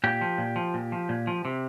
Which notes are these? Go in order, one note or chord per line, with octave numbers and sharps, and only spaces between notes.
A#2 G4
F3
A#2
F3
A#2
F3
A#2
F3
C3